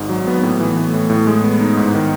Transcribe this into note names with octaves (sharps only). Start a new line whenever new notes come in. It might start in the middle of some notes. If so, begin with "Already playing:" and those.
Already playing: G#1 G#2
F#3
B3
A2
E3
A3
A2
A2
G#3
B3
D#4
G#2
D#3